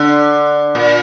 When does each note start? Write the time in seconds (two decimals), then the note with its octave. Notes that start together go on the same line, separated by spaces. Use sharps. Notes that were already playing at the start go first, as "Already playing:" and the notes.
Already playing: D3
0.75 A#2